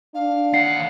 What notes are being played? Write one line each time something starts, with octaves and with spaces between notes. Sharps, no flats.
D4 F5
D#2 F#5 C7